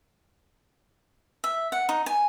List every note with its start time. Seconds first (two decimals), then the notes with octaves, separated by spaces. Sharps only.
1.44 E5
1.72 F#5
1.89 D#4
2.06 G#5